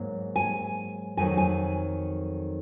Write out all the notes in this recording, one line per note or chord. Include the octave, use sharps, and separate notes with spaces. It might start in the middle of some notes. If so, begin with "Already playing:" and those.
Already playing: G#2 F#3 A#3
G#5
F2 D#3 F#3 G#5
G#5